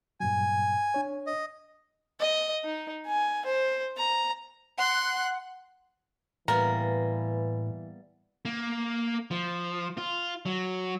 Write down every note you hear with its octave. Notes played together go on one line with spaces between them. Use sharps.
G2 A#2 F#3 G#5
D4 C#5
D#5
D#5
D#4
G#5
C5
A#5
F#5 C6 F#6
A2 E3 G3 A#3 B3 A#4
A#3
F3
F4
F#3